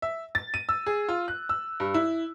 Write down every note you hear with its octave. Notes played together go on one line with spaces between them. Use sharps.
E5
A6
D#7
E6
G#4
F4
F#6
E6
G2
E4